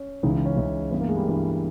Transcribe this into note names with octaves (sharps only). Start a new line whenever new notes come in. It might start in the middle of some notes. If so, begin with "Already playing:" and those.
Already playing: C#4
C#2 C#3 E3 D#4
D#4
C#4
C#2 C#3 E3
G2 E3 B3
A#3
G#3
G3
G2 E3 A#3